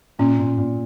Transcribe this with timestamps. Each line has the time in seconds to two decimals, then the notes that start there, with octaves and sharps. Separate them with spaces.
0.19 A#2 C#4
0.39 A#2
0.58 A#2